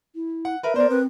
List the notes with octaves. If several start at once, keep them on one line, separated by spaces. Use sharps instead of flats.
E4
F#5
A#4 B4 E5
B3 A#4 C5 D5
C4 B4